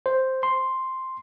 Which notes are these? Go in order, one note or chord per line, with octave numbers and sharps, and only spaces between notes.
C5
C6